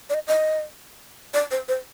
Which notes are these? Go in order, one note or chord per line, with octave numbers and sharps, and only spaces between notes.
D5
D#5
D#5
D5
C5
C5